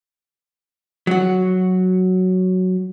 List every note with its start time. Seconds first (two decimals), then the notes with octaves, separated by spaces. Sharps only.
1.07 F#3 F#4